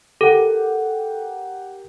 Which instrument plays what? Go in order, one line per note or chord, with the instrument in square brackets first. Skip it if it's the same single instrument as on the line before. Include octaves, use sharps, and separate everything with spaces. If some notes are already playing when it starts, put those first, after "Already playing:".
[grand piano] G4 A#4 F#5 [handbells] A4